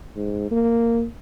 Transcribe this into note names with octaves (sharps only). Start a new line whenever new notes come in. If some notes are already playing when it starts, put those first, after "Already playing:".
G#2
A#3